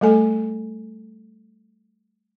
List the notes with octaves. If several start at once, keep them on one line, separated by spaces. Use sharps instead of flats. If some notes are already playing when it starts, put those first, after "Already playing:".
G3 A3 A4 G#5